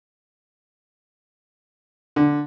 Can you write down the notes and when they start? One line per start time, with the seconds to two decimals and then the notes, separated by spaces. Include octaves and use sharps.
2.16 D3